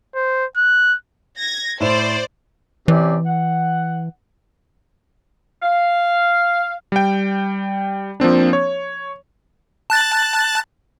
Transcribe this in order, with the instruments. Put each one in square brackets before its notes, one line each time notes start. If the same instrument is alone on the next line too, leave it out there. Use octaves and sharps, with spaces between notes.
[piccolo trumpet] C5
F#6
[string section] G#6 A#6
[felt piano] A2 E7 [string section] C5 D5
[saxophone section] C3 C#4 D5 [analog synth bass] E3
[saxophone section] F#5
F5
[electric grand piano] G3 G5
F3 A#3 C4 D4
C#5
[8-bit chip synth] A5 F#6 A6